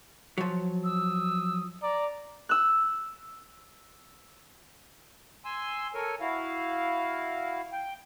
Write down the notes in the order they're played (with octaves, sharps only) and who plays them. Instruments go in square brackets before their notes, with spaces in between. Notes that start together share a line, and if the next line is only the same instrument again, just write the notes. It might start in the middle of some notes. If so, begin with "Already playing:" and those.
[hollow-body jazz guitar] F3 F#3
[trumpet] D#6 [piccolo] E6
[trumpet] D5 [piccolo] A#5
[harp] E6 F#6
[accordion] G#5 C6 E6
A4 A#4 C#5 G#5
E4 F#4 F5
G5